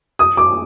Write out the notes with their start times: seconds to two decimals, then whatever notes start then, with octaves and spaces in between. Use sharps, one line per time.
0.19 D#6
0.37 D6